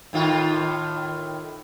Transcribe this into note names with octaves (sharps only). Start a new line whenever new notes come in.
A2 D#3 F4